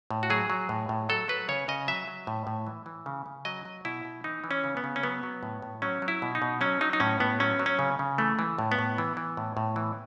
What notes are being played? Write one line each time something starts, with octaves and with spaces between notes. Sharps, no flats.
A2
F#4
F#3 G#4
F#3
A2
A2
F#3 A4
F#3 B4
C#3 C#5
C#3 D#5
F#3 E5
F#3
A2
A2
E3
E3
C#3
C#3
F#3 D#5
F#3
B2 E4
B2
E3 D#4
E3
C#4
C#3
B3
C#3
C#4
F#3 B3
F#3
A2
A2
F#3 C#4
F#3
E4
B2
D#4
B2
F#3 C#4
F#3 D#4
D#4
A2 C#4
A2 B3
F#3 C#4
F#3
C#4
C#3
C#3
E3 A3
E3
A2
B3
A2
E3
E3
A2
A2
E3